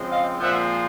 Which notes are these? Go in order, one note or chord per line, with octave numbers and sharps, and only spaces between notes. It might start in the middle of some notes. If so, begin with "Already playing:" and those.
Already playing: C#3 F3 G#3 C4
D#5 F5
A#2 F3 G#3 C4 E5 F#5